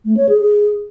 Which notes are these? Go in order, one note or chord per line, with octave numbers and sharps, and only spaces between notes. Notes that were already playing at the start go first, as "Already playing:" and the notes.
A3
C#5
G#4
G#4